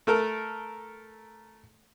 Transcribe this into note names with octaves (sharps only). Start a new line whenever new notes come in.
A3 A4 A#4